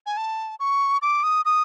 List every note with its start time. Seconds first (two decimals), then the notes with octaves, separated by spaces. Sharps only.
0.06 G#5
0.17 A5
0.60 C#6
1.02 D6
1.23 D#6
1.45 D#6